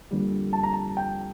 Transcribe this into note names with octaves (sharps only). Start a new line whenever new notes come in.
F2 D3 G3 A#3
A5
A#5
A5
G5